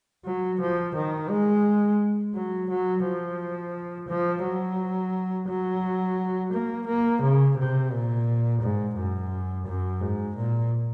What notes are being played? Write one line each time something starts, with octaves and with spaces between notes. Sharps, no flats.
F#3
F3
D#3
G#3
F#3
F#3
F3
F3
F#3
F#3
A#3
A#3
C#3
C3
A#2
G#2
F#2
F#2
G#2
A#2